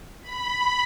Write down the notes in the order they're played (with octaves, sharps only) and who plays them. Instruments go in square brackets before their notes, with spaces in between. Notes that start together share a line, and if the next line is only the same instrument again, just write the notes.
[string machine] B5